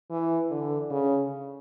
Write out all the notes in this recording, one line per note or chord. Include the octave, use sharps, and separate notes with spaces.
E3
D3
C#3